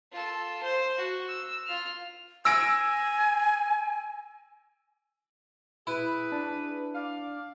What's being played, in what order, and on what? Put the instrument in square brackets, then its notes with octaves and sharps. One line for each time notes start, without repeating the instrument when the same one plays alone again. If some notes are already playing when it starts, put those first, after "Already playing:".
[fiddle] F4 A4
C5
F#4
E6
F4 F6
[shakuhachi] G#5 [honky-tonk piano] E6 A#6 D7
[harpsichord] E4 [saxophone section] G#4 B4
[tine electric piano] D4
[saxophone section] D5 F5